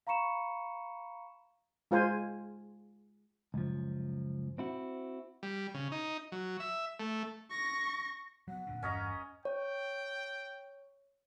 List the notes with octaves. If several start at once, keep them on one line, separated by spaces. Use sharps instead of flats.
F5 A#5 B5 C#6 C#7 E7
G#3 F4 C5 G#5
C#2 F#2 F3
C4 E4 F#4
G3
C#3
D#4
F#3
E5
A3
C#6 A#6
F#3 G3 B3 F#5
F2 A#2 D3
G1 E2 G2 C#4 D#5 A#5
C#5 G5